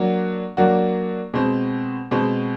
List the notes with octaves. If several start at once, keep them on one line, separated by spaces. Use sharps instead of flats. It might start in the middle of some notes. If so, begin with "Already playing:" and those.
Already playing: F#3 A#3 D4 F#4
F#3 A#3 D4 F#4
B2 G#3 C4
B2 G#3 C4